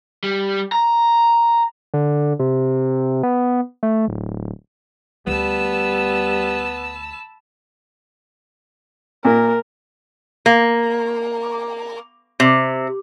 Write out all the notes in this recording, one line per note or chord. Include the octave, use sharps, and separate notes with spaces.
G3
A#5
D3
C3
B3
A3
D1
D2 G3 B3 A5 B5 E6
A#2 A#4
A#3
C3